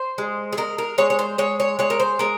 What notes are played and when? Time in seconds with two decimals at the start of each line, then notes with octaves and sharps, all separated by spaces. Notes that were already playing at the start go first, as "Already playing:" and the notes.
Already playing: C5
0.18 G#3
0.53 G#4
0.57 G#3 A#4
0.78 A#4
0.98 G#3 C#5
1.10 C#5
1.19 C5
1.38 G#3 C#5
1.60 C#5
1.79 G#3 C#5
1.90 A#4
2.00 C5
2.19 G#3 A#4